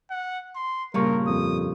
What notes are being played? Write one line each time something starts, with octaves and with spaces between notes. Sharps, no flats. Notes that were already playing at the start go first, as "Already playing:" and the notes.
F#5
C6
G2 A#2 C#3 G3 A#4 C#6
F2 D#6